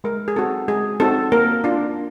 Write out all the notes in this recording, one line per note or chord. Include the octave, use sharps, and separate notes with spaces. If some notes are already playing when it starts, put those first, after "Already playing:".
G#3 A#4
G#4
C4 D#4 F#4 A4
G#3 G#4
C4 D#4 F#4 A4
A#3 A#4
D4 F4